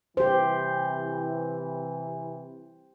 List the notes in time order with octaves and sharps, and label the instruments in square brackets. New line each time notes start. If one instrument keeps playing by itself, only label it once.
[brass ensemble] C3 E3 [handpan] G4 C5